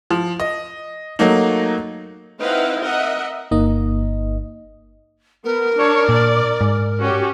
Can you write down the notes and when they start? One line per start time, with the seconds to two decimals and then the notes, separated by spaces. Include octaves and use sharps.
0.11 F3
0.40 D#5
1.19 F#3 A3 A#3 D#4
2.40 C4 D#4 E4 B4 F5 F#5
2.82 A#4 D#5 E5 F#5
3.51 G1 A#3 D#4 D#5
5.44 B3 A#4
5.76 D4 C#5
6.09 A#2 D5
6.61 G#2
6.99 C#4 F#4 G4